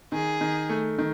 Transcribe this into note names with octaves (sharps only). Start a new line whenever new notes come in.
D#3 G#4
D#3
A3
D#3